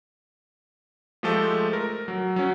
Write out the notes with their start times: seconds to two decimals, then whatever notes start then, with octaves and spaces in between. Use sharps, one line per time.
1.23 F3 G#3 A3 G4 A4
1.73 A#4
2.08 F#3
2.36 F#3 C#4